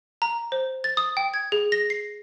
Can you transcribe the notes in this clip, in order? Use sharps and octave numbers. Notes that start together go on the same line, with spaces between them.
A#5
C5
A6
D#6
G5
G#6
G#4
A#6
C7